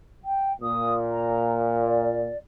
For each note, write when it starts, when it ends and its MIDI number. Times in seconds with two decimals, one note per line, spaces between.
0.24 0.53 79
0.61 2.28 46
0.61 0.93 87
1.10 1.54 82
1.82 2.37 74